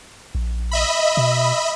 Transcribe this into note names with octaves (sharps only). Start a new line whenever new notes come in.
A#1
D#5 E5 B5
B2